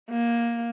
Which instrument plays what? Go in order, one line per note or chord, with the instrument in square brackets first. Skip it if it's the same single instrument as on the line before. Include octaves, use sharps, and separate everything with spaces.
[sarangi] A#3